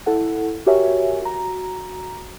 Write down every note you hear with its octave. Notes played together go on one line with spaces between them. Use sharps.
E4 A4 F#5
F#4 G4 A#4 C#5 E5 G#5
F#4 A#5